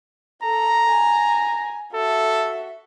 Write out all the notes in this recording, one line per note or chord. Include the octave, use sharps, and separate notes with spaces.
A4 A#5
G#5
F#4 A4 E5